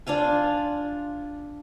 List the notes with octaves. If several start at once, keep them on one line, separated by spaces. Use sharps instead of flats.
D4 F4 F5 G#5